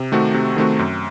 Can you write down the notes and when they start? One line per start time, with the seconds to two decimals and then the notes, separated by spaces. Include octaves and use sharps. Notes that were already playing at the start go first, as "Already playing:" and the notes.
Already playing: C3
0.12 D#3 A3 C4 F#4
0.34 C3
0.56 D#3 A3 C4 F#4
0.79 F#2